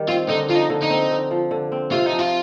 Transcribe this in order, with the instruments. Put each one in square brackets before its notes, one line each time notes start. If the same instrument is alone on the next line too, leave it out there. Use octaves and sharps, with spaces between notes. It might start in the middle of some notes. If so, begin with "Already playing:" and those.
Already playing: [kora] D#3 G3
[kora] C4 [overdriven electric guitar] F4
[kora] D3 [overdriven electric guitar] D#4
[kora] F3 [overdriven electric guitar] F4
[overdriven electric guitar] D#4
[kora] D3
[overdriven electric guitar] D#4
[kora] C4
D3
F3
D3
C4
[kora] C3 [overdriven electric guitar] F4
[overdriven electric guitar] D#4
[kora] F3
[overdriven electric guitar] F4